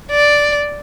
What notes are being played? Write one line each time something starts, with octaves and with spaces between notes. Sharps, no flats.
D5